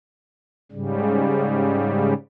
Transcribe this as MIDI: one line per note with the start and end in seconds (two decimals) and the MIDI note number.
0.72 2.14 44
0.72 2.14 49
0.72 2.14 55